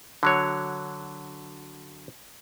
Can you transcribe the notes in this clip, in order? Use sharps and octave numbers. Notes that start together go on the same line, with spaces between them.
D3 F#3 C#5